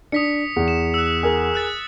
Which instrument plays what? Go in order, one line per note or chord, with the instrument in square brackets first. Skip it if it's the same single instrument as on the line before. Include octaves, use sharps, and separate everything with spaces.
[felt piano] D4 [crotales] D#6 B6 C#7
[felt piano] E2
[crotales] E7
E6 F#6
[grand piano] G#4 A#4
[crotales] E6 F#6 A6